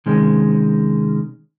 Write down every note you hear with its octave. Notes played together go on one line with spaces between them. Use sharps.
C3 D#3 G#3 C#4